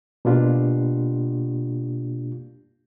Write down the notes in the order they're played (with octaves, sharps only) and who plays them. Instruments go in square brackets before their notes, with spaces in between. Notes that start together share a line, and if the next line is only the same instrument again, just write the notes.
[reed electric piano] B2 A#3 D4 F4 G4